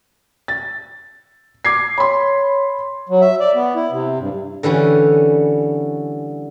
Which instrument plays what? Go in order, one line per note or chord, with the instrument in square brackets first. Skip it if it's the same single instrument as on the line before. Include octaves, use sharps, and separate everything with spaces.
[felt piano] A6
D6 G#6 C7
[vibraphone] C#5 [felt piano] B5 C6
[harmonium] F#3
E5
D5
B3
E4
C3
G2
[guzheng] D3 E3 G3 C#4